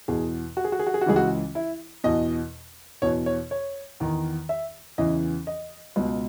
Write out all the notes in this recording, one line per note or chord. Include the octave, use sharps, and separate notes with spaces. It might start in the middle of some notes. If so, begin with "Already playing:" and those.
E2 B2 G#4
F#4
G#4
F#4
G#4
F#4
G#4
F#4
C#2 C#3 E3 G#4
F#4
E4
E2 B2 D#5
E2 B2 C#5
C#5
C#5
E2 D#3
E5
E2 C#3 E3 D#5
D#5
C#2 B2